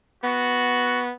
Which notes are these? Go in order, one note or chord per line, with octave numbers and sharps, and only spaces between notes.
B3 F#4